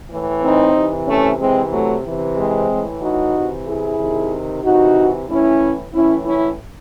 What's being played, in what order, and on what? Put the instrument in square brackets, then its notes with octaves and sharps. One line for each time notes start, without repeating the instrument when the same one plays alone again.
[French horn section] A2 E3
C4 D#4
C3 E3
A3 C#4
C3 E3 G#3 C4
F#3 A3
C3 E3
G#3 C4
A2 E3
D#4 F#4
C3 E3
E4 G#4
C3 D#3
C3 E3 D#4 F#4
A2 E3 C#4 E4
A2 E3 C#4 E4
C#4 E4